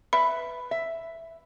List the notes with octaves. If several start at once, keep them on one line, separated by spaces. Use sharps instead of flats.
B4 E5 B5
E5